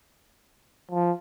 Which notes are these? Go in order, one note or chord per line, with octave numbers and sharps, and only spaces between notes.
F3